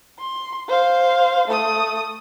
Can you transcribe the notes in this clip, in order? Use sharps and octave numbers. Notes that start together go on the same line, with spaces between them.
C6
C5 F5
A3 D#6